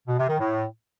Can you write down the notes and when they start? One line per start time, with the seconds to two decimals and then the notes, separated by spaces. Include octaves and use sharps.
0.07 B2
0.18 C3
0.28 D#3
0.39 A2